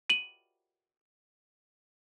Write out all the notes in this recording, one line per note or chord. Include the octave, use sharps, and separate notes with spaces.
D#7 F#7